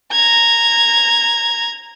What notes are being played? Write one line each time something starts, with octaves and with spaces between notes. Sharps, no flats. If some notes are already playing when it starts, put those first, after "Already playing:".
A#5 G#6